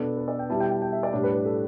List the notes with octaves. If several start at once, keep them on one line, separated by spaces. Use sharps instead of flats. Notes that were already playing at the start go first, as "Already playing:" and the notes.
Already playing: B2 B3 D4 A4
B4
D5
G5
B2 G3 E4 A5
G5
G5
G5
E5
D5
A2 G3 D4
B4
B4
A4